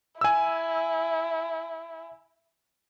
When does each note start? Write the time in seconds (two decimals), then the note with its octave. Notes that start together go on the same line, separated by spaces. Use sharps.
0.21 E4 G#5 E6